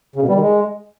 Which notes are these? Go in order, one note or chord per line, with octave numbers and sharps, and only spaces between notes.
C#3
B2
G3
D#3
G#3